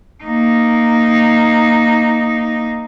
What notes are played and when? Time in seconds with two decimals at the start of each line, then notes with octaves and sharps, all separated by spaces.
0.24 A#3 D#4